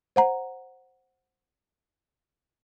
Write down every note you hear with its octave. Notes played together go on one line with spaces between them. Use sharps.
C5 F#5 A#5